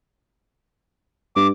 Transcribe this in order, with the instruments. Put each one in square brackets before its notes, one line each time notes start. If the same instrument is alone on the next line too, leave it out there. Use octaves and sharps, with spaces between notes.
[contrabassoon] G2 [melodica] D6